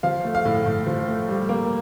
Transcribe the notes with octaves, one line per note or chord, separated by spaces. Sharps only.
F3 F5
A3
F5
A2
A2
F3
A3
G3
A#3